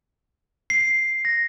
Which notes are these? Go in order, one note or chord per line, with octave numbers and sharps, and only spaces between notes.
C7
A#6